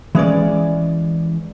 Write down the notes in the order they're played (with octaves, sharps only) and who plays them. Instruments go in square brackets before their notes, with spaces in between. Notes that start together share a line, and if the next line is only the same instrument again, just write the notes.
[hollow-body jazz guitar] E3 G#3 C#4 D5